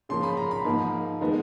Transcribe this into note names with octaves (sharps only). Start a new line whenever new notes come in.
C#3 F3 A#3 C6
B5
A#5
B5
G#2 F3 A#3
D#3 G#3 B3